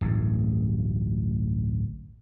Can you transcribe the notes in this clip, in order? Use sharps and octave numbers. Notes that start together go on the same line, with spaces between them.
D1 A1 G2